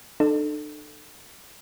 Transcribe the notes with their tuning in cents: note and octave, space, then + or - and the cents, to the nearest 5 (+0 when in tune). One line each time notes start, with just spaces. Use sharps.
D4 +45 A4 +0